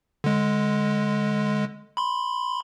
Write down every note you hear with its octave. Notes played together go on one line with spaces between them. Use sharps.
D3 G#3
B5 C6